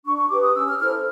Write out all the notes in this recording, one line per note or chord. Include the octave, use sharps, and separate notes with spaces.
D4 C#6
C#6
G4 B4 D6
D#6
C#4 E6
F6
E4 A4 C5 F6